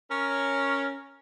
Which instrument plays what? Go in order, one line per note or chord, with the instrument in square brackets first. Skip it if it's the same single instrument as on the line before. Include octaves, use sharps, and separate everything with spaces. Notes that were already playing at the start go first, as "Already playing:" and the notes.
[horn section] C#4 [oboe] A#4